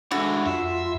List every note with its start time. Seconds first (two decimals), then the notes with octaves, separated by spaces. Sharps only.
0.11 G#3 D4 E4 F#4 A4
0.46 F2 F4 E5 C6